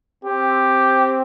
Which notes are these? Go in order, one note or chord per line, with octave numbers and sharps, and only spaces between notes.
C4 G4